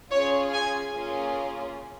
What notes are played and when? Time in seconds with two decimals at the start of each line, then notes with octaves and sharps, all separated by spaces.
0.11 C#4 F4 G#4 C#5
0.52 G#5
0.93 A#3 C#4 F4 G#4